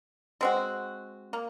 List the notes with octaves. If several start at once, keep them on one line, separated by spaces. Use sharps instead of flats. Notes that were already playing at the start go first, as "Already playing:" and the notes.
G#3 C4 F#4
A#3